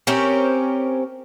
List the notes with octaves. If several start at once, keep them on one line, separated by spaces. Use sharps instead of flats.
C4 C#4 G4 A#4